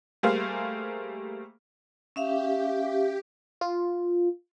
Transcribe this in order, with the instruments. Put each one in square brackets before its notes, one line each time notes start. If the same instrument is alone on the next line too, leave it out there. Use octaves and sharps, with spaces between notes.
[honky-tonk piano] G3 A3 A#3 G#4 C5 F5
[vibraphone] C#4 E5 F5 [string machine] G4
[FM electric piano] F4